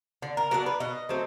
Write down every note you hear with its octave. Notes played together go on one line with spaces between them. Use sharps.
D3
A#4
F#3 B3 D4 A#4
B4
B2 D#5
F#3 A3 C4